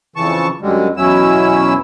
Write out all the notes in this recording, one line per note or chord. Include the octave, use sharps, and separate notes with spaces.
F2 C#3 E3 A5 C#6
F#2 D3 G3 G#3
E2 B2 F#3 C#4 E4 E6